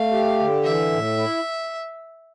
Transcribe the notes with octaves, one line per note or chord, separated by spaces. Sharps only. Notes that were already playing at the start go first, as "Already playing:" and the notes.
Already playing: A3 F5
G4
D3
E3 E5
A2
E4